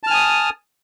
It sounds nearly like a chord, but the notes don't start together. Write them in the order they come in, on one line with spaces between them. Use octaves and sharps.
A5 F6 G#5 D#6